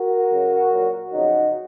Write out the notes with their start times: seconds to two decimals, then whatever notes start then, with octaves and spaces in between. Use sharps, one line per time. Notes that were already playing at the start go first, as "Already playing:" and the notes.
Already playing: F#4 A#4
0.30 F#2 C#3 F#3
0.71 A#2 F#3
1.12 F2 C#3 F#3 D#4 F#4